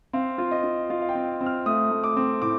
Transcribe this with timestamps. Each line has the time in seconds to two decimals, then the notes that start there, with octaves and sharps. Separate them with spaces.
0.13 C4 F5
0.38 F4
0.51 D#5
0.64 F4
0.90 F4 F5
1.02 F5
1.09 G5
1.15 C4
1.41 C4
1.46 F6
1.66 A3 D#6
1.91 A3
2.04 D6
2.17 C4
2.42 A2 D6